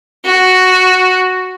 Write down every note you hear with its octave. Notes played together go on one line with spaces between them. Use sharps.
F#4